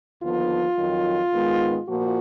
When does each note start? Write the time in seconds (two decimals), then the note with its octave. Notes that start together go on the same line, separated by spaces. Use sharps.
0.22 D#2 D3 F3 B3 F4
0.78 F2 D#3 F#3
1.33 G#2 D#3 G#3 B3
1.88 A#2 F3 A#3 F#4